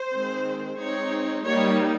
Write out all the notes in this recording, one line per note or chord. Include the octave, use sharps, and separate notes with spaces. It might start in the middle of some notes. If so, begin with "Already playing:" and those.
Already playing: C5
D#3 G#3 C4
G#3 C4 D#4 C#5
G3 A#3 D#4 C#5